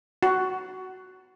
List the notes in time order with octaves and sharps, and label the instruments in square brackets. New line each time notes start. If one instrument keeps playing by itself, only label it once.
[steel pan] F#4